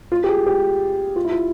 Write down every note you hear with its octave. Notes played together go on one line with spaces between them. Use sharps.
F4
G4
G#4
G4
F4
E4
F4